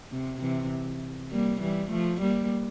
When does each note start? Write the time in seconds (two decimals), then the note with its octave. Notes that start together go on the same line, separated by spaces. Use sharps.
0.12 C3
0.41 C3 E3
1.31 G3 A#3
1.61 E3 G3
1.91 F3 A3
2.21 G3 A#3